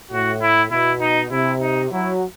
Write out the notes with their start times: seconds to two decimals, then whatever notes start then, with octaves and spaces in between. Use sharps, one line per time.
0.12 A2 F#4
0.42 E4
0.71 B2 E4
1.00 D#4
1.31 C3 E4
1.61 D#4
1.90 F#3 E4